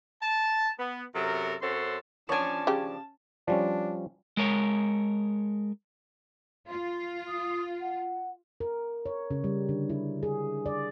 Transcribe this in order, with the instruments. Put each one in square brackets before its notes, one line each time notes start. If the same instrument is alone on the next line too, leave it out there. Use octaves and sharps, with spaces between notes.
[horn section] A5
B3
F#2 C3 F#3 A4 A#4
F#2 C4 C#4 A4 F#5 C6
[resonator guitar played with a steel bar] F3 D4 [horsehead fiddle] C#4 A5 [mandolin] C#5 G#5
[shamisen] C#3 G4
[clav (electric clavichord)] F3 G3 C#4 [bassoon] D4
[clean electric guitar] G#3 A#4 C#5
[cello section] F4 [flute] C6
[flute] D#6
F#5
[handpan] A#4
C#5
C#3
G3
D3
E4
G#4
D5